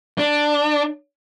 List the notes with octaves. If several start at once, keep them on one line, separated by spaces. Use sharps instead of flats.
D4